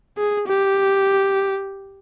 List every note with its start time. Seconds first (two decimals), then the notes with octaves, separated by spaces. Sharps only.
0.17 G#4
0.47 G4